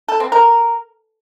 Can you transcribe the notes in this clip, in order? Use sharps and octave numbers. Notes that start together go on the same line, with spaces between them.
A4
C4
A#4